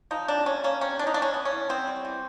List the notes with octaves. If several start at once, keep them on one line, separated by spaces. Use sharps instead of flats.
F3 D#4
C3 D4
A#3 C#4
A#3 C#4
C3 C#4
E3 D4
D#4
B3 D4
C#4
B3
C#4
E3
B3 C4
G3
E3